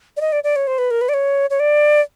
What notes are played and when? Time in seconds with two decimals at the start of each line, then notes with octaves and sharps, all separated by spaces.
0.17 D5
0.21 D#5
0.32 D5
0.44 D5
0.56 C#5
0.67 C5
0.78 B4
0.91 A#4
1.01 B4
1.09 D5
1.14 C#5
1.50 C#5
1.60 D5